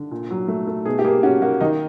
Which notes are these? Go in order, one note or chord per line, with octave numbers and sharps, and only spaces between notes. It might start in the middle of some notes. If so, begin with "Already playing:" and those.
Already playing: D3
A#2
F#3
A3
A3
B2 G#4
G4
A#3 G#4
C#4 F#4
A#3 F#4
D#3 D#4